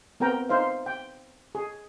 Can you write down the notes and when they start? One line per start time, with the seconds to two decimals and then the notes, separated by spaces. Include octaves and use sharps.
0.20 B3 C4 A#4 G5 A#5
0.49 D#4 C5 E5 F5
0.86 G5
1.55 G#4